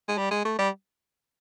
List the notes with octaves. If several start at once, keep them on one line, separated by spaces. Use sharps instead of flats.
G#3
G3
G#3
A3
G3